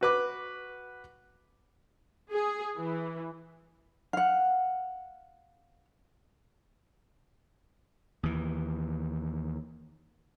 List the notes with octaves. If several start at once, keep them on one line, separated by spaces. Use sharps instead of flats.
F#4 B4 D6
G#4
E3
F5 F#5
D#2 E3